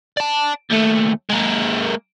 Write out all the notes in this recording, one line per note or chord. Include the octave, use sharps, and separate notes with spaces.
D5 A5
D#2 A3
G#3 A#3